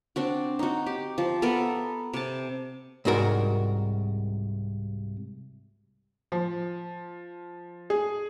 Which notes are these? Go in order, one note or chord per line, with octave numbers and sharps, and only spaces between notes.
C4 D4 F#4
D#4 F#4
G4
F3
B3 A4 A#4 E5
C3 A5
C2 G#2 F#4 A#4
F3
G#4